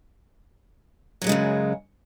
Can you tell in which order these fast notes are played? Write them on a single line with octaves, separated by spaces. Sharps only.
F#3 A#2 G#3 C#3 F#2